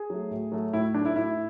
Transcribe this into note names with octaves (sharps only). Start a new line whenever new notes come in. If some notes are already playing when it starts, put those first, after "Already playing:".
Already playing: G#4
F#3 A3
A2
F#3 A3
A2 E4
F#3 A3 D4
E4
A2 E4